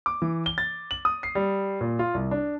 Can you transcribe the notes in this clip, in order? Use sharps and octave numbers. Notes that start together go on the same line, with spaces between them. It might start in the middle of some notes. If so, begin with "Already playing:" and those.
D6
E3
G7
A6
F#7
D#6
C7
G3
A#2
F4
C2
D4